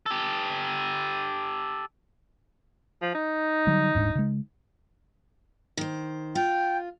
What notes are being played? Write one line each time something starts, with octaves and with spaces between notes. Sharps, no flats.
G4 A4
F3
D#4
D3 F#3 G3
D#1 G#2 D4
C#3 G#3
D#3 C5
F4 G5